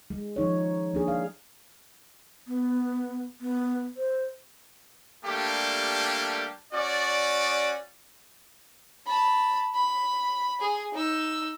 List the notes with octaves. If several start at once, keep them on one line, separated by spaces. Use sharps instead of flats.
G#3
F3 D#4 C#5
A#3 D4 G#4
F5
B3
B3
C5
G3 A3 A#3 D4 G4
C#4 F#4 D5
A5 B5
B5
G#4
D#4 E6